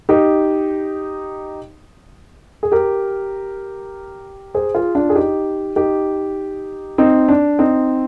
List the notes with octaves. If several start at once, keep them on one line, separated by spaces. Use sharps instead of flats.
D#4 G4
G#4
G4 A#4
G#4 C5
F4 G#4
D4 F4
G#4
D#4 G4
D#4 G4
C4 D#4
D4
C4 D#4